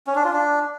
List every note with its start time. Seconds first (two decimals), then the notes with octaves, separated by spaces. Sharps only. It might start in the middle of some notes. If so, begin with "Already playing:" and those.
0.07 C#4
0.16 D4
0.24 F4
0.33 D4